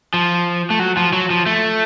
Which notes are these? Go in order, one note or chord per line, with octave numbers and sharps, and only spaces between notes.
F3
A3
F#3
F3
F#3
F3
A3